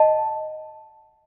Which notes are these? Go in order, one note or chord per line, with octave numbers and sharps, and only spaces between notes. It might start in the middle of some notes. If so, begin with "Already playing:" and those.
Already playing: D#5 F#5 A5